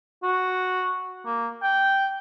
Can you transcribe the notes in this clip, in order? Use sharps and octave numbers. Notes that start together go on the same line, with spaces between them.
F#4
A#3
G5